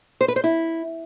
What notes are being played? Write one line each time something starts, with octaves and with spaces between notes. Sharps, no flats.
C5
B4
C5
E4